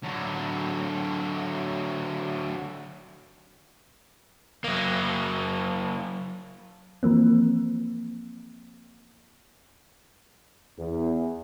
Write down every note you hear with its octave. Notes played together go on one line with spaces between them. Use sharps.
D3 F#3
F#3 A#3
E3 F3 A#3 C4
E2